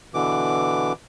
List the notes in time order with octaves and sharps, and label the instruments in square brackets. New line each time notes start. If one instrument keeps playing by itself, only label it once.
[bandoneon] B2 D3 E3 D6